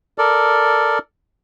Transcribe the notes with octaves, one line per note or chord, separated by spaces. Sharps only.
A4 A#4 D5